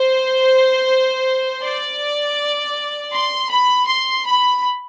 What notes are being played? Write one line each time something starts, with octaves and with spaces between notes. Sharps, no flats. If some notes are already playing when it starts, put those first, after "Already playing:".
Already playing: C5
D5
C6
B5
C6
B5